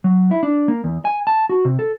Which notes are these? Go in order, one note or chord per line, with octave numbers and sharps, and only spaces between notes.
F#3
E4
D4
A#3
E2
G#5
A5
F#4
C3
A4